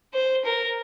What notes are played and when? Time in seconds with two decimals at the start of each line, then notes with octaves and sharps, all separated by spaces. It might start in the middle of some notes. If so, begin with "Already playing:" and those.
0.14 C5
0.45 A#4